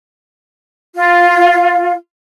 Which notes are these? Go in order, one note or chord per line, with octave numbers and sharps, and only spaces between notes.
F4